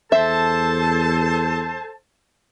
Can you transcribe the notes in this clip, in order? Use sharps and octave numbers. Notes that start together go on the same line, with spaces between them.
E2 A4 C5 E5 A5